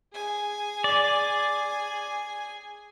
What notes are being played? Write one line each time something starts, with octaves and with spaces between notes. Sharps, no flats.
G#4 G#5
D5